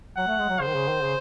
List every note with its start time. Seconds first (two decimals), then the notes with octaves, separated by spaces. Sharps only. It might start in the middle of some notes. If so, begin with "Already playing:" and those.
0.17 F#3 F#5
0.27 A3
0.39 G#3
0.49 F#3
0.60 C#3 C5
0.68 D#3
0.75 C#3
0.89 D#3
1.03 C#3